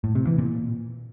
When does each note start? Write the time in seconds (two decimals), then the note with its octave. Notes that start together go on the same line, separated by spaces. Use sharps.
0.04 A2
0.15 C3
0.27 E3
0.38 A#2